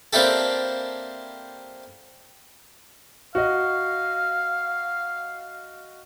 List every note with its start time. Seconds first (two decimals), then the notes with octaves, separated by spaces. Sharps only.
0.13 A#3 C4 D4 E4 G4 A4
3.35 F#4 D#5 F5